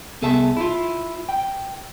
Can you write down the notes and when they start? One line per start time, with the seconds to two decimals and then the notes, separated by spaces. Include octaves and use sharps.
0.22 C2 B3 G#4 A4 E5 A5
0.57 E4 F4
1.29 G5